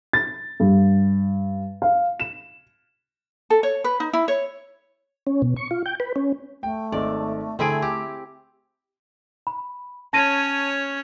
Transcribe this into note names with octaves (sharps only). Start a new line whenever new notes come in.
A6
G2
F5
E7
A4
C#5
B4
D#4
E4
C#5
C#4
B2
C#6
F4
G5
B4
C#4
A3 G5
G#1 D#4 A4 D5
D3 A3 C4 E4 G#4 D7
G4 D6
B5
C#4 C#5 A5 A#6 D#7